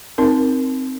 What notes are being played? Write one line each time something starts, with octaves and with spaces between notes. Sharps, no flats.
C4 D#4 A#4